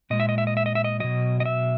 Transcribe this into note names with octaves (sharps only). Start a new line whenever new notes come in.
A#2 G#3 D#5
E5
D#5
E5
D#5
E5
D#5
E5
D#5
B2 F#3 D#5
D#5
E5